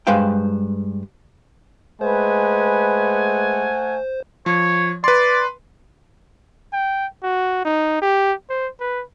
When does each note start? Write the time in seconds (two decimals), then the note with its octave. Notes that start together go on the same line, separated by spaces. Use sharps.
0.07 G2 G#3 B4 C5 F5 G5
2.01 G#3 A3 B4 C5 F#5 G#5
4.46 F3 C#5
5.04 B4 D5 C6
6.73 G5
7.23 F#4
7.65 D#4
8.02 G4
8.50 C5
8.80 B4